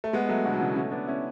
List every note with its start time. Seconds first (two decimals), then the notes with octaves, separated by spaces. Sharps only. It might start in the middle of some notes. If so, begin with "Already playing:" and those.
0.04 A3
0.13 G#3 B3
0.29 F#3 A3
0.45 B2 D3
0.54 F#3
0.61 C#3 E3
0.76 A3 C#4
0.91 B3 D4
1.07 C#4 E4